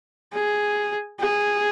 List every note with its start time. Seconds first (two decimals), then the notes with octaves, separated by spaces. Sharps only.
0.34 G#4
1.20 G#4